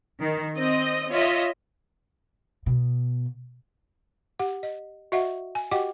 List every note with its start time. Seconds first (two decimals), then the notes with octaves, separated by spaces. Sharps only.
0.21 D#3
0.56 C4 D#5
1.11 F4 C#5 D#5 E5
2.66 B2
4.40 G4 F#5
4.63 D#5
5.12 F#4 D#5 E5 F#5
5.55 G#5
5.71 F#4 G4 D#5 F#5 G5 D6